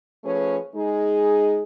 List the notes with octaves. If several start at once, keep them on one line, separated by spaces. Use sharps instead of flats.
F3 A3 C#4 G#4 B4 C#5
G#3 D#4 G#4